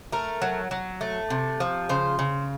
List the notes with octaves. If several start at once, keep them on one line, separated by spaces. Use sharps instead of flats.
A3 A#4
F#3
F#3
A3
C3
F3
C#3 C5
C#3